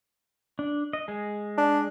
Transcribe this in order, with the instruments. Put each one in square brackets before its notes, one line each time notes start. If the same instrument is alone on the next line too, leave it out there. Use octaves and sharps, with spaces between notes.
[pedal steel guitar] D4
D#5
G#3 G#4
[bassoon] D4